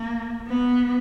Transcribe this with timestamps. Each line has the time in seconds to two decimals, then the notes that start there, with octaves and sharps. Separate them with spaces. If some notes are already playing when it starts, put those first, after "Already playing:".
Already playing: A#3
0.48 B3